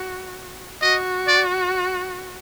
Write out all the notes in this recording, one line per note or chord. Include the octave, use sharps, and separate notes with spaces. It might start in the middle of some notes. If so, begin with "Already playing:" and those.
Already playing: F#4
F#4 D#5
D5